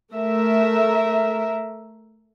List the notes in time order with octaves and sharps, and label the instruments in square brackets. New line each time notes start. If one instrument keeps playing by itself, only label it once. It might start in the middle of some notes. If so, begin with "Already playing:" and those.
[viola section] A3 A#4 E5